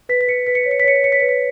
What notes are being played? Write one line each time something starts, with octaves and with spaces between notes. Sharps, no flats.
B4 B6
B6
B4 C#7
B4 B6
C#7
C#5 B6
C#7
B6
C#5 C#7
B6
C#5 C#7
B6
B4 C#7
B6